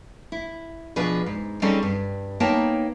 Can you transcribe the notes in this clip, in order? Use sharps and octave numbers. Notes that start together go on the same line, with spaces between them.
E4
B2 F3 D4 G#4 B4
G#2
G3 C4 C#4 D#4 G#4 A4
G2
A#3 B3 D#4 C#5 G5 A5